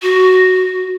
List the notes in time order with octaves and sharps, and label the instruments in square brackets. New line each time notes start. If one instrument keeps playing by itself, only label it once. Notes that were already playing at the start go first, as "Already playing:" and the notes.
[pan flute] F#4